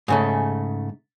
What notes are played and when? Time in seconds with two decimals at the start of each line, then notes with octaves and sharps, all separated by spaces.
0.08 G#2 C#3 A3